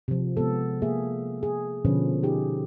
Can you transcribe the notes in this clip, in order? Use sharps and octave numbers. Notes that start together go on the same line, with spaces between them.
C3 F3
C3 G#3 B3 A4
A#3 G#4 E5
G#4
B2 D3 F3 C#4 B4
D#4 G4 G#4